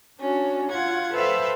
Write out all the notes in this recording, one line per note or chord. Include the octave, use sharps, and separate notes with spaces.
C#4 D4 F#4
F4 F#5 G#6
A4 B4 C5 E5 F5 G5